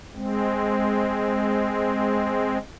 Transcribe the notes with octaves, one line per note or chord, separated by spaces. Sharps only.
G#3 C4